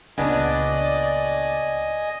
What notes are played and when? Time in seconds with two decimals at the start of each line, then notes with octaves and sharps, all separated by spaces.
0.18 C#2 A#2 C#3 B3 D4 D5 D#5 G#5